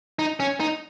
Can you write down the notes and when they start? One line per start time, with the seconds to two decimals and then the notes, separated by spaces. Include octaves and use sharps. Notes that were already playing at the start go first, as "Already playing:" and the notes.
0.19 D#4
0.40 C#4
0.60 D#4